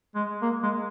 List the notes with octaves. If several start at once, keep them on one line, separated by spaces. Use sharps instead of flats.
G#3
A#3
G#3